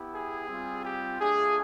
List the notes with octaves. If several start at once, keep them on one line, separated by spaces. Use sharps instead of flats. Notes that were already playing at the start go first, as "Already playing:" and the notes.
Already playing: B3 E4 G4
G#4
G3 C4 F4
G4
A3 D4 F4 G#4